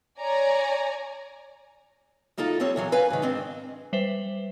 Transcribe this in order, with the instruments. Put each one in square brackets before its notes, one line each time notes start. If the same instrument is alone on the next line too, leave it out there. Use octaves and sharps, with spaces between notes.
[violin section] C#5 D5 G#5 A#5
[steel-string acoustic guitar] D2 A#3 D#4 F4 A4
G3 C4 A4 C#5
A#2 E3 F#3 G#4
B4 F5 G#5
G#2 D#3
G#2 C4 D4 D#5
[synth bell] G3 B4 C5 E5